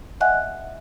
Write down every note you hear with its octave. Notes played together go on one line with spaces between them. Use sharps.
D#5 E5 F#5 G#5 F#6